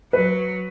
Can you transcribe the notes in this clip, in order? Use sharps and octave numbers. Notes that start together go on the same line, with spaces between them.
F#3 B4